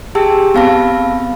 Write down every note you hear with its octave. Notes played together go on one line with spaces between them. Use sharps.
G4 G#4 G5 A5 E6
B3 C4 F5 A5 B5 A#6